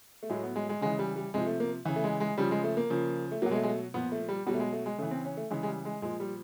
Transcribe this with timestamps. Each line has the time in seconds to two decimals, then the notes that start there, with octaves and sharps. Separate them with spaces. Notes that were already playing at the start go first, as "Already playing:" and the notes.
0.23 A3
0.30 A2 F#3 G#3
0.43 B3
0.56 G#3
0.69 G#3
0.81 C#3 E3 G#3
0.99 G3
1.16 G3
1.34 C3 F3 G#3
1.46 A3
1.60 A#3
1.85 C#3 E3
1.96 A3
2.04 G#3
2.20 G#3
2.38 C#3 F3 G3
2.51 G#3
2.64 A3
2.77 A#3
2.90 C#3 F3
3.31 A3
3.42 B2 F#3 A#3
3.51 G#3
3.55 A3
3.63 G#3
3.68 A3
3.94 A#2 F3 B3
4.12 A3
4.29 G3
4.46 B2 F#3 G3
4.54 A3
4.60 G#3
4.73 A3
4.86 G#3
4.98 C#3 E3 A3
5.11 C4
5.25 C#4
5.37 A3
5.51 C#3 E3 G#3
5.63 G#3
5.67 G3
5.85 G#3
6.02 A#2 F3 G#3
6.20 G3